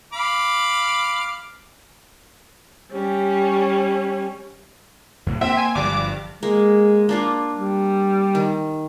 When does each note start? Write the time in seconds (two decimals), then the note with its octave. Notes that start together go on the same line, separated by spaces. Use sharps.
0.13 F5 B5 D6
2.92 G3 C#4
5.26 E2 A2
5.41 A#3 C4 E5
5.57 G#5
5.75 G1 G2 D3 F3 G3 D6
6.43 G#3 A#3
7.09 A#3 D4 F4
7.55 G3
8.35 D#3